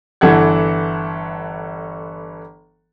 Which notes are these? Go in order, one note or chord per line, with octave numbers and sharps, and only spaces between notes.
G1 E3 A4 F#5 G#6